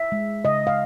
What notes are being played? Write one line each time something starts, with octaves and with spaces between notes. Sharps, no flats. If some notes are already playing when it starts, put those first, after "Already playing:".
Already playing: E5
G#3
C#3 D#5
F5